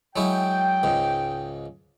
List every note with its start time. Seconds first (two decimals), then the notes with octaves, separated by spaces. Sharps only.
0.16 F#3 G#3 E4 G5
0.83 C#2 G#2